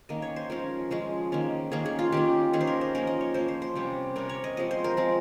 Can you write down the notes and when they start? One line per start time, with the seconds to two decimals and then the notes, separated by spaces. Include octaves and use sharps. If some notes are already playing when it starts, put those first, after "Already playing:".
0.09 D#3 A#3 C#4 D#5
0.22 C#5
0.36 C5
0.50 F3 G#3 C#4 A#4
0.91 F3 G#3 C#4 G#4
1.32 D#3 A#3 C#4
1.72 D#3 A#3 C#4 G#4
1.86 G#4
1.99 F4
2.12 D#3 A#3 C#4 G4
2.53 D#3 A#3 C#4 G#4
2.61 C5
2.67 A#4
2.81 C5
2.95 F3 A#3 C#4 A#4
3.07 D#5
3.21 C#5
3.34 F3 A#3 C#4 C5
3.48 C5
3.62 C5
3.76 C3 G3 C#4
4.16 C3 G3 C#4 A#4
4.29 C#5
4.44 D#5
4.57 F3 G#3 C4 D#5
4.71 C5
4.84 A#4
4.97 F3 G#3 C4